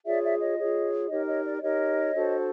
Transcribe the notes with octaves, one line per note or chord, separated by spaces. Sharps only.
F4 G#4 C#5 D5 E5
D5 E5
C#5 D#5
F4 G#4 C#5
D#4 G4 A#4 C#5 D#5
C#5 D#5
D5
D5
D#4 G4 A#4 C#5 D#5
D4 F#4 A4 C5